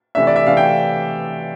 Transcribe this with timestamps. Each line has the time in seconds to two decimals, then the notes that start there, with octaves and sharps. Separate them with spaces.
0.15 C3 E3 A3 D4 E5
0.27 D5
0.36 E5
0.47 C3 E3 A3 D4 F5
0.57 G5